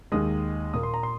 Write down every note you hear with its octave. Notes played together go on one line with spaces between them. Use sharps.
D#2 D#3 G#3 D#6
A#2 A#3 D#6
C6
A#5
C6